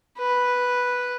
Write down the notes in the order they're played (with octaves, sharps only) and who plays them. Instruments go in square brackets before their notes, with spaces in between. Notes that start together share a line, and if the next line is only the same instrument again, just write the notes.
[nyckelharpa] B4